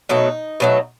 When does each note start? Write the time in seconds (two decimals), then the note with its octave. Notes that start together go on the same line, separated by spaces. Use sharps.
0.09 B2 F#3 A3 D#4
0.60 B2 F#3 A3